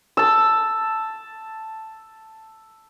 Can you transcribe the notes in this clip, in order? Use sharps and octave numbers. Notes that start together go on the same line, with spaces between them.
A5 E6